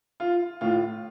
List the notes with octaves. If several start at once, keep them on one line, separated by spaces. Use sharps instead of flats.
F4
A2 F4